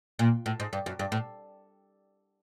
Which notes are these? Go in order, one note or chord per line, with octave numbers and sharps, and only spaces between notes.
A#2
A2
G#2
G2
F#2
G2
A2